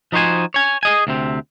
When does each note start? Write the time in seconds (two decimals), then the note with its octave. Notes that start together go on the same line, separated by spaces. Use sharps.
0.12 F3 D#4 F#4 C5 G#5
0.54 C#5 G#5
0.83 G#4 D#5 G#5
1.07 D2 C3 C4